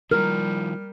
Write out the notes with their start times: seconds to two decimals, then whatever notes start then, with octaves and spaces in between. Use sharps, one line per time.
0.11 D#3 F3 G3 A#4 F6